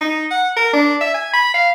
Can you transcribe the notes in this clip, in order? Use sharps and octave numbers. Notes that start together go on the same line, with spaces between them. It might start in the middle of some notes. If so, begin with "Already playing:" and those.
D#4
F#5
A#4
D4
E5
G#5
B5
F5